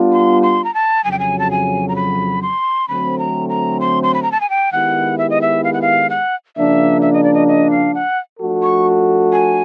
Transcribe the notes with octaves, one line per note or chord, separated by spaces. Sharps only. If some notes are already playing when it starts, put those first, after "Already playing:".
Already playing: G3 B3 D4 F4
C6
C6
A#5
A5
F2 C#3 F#3 G#5
G5
G#5
A5
G#5
A#5
B5
C6
D3 F#3 A3 C4 B5
A#5
A#5
C6
C6
B5
A#5
A5
G#5
G5
D#3 G#3 B3 E4 G4 F#5
E5
D#5
E5
F5
F#5
F5
F#5
C#3 F3 A#3 D4 E5
E5
D#5
D5
D#5
D#5
F5
F#5
F3 A3 D4 F#4 A4
C#6
G#5